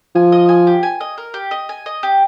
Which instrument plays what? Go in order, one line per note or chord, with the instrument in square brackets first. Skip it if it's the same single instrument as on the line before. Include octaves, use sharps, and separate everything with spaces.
[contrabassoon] F3 [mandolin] G#5
[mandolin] D#5
G#5
G4
G#5
D#5
A#4
G4
D#5
G#5
D#5
G4